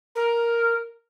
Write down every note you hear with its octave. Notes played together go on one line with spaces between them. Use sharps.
A#4